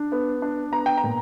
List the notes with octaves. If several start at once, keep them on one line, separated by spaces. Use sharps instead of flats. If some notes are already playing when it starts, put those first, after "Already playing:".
Already playing: D4
B3
D4
B3 A#5
G5
A#5
A#2